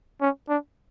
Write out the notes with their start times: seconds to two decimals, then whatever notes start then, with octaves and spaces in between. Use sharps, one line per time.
0.21 C#4
0.49 D4